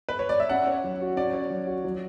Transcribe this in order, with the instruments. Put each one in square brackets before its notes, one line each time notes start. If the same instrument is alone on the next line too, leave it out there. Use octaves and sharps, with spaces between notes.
[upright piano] B4
C#5
D5
E5
[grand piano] C#4 [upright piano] F#5
[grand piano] C#5
F#3
F#4
[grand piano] C#4 [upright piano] D5
[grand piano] C#5
F#3
F#4
F#3